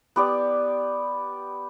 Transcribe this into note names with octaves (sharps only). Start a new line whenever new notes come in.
B3 G4 D5